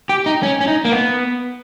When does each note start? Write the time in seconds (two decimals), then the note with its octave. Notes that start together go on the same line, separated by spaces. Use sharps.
0.09 G4
0.26 D#4
0.43 C#4
0.61 C#4
0.67 D#4
0.85 A#3
0.92 B3